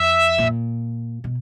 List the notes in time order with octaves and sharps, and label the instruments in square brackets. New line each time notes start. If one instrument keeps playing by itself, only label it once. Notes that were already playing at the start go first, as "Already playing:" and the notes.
Already playing: [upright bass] F2 [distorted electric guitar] E5
[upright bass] A#2
B2